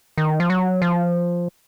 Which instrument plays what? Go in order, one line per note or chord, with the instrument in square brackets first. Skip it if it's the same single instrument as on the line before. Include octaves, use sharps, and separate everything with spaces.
[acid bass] D#3
F3
F#3
F3